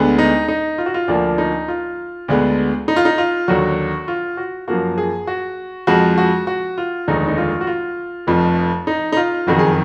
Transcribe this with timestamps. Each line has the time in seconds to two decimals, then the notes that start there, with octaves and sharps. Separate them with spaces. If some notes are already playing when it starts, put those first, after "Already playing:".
Already playing: D2 D3 G#3 B3
0.19 D#4
0.48 D#4
0.78 F4
0.86 F#4
0.94 F4
1.08 D2 D3 F3 A#3 D4
1.38 D#4
1.68 F4
2.28 D2 D3 G#3 B3
2.88 D#4
2.96 F4
3.05 D#4
3.18 F4
3.48 D#2 D3 F#3 F#4
4.08 F4
4.37 F#4
4.68 F#2 F3 A#3 F#4
4.98 G#4
5.27 F#4
5.87 F2 F3 G#3 F#4
6.18 F#4
6.47 F#4
6.78 F4
7.07 F1 D#2 D3 G#3 D#4
7.28 D#4
7.38 F4
7.61 F#4
7.67 F4
8.27 F1 F2 F3
8.87 D#4
9.12 D#4
9.17 F4
9.47 F#1 F2 D#3 F#4
9.59 G#4